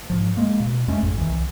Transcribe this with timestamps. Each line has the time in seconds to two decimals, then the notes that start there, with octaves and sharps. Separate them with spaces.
0.10 G#2 F3
0.37 G#3 A#3
0.60 B2
0.88 F2 G#3 A3 C#4
1.02 G#1 F2
1.18 C2 D#3 E3